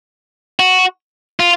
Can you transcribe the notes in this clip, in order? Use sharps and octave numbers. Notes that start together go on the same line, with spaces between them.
F#4
F4